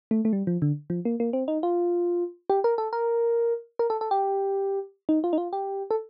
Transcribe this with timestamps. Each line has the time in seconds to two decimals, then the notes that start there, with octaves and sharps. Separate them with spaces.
0.11 A3
0.25 A3
0.33 G3
0.47 F3
0.62 D3
0.90 F3
1.05 A#3
1.20 A#3
1.33 C4
1.48 D#4
1.63 F4
2.50 G4
2.64 A#4
2.78 A4
2.93 A#4
3.79 A#4
3.90 A4
4.01 A4
4.11 G4
5.09 D#4
5.24 F4
5.33 D#4
5.38 F4
5.53 G4
5.91 A4